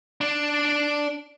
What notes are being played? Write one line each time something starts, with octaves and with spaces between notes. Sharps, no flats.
D4 D5